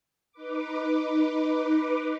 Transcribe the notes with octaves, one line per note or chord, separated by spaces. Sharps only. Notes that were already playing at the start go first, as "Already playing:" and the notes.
D#4 B4 D6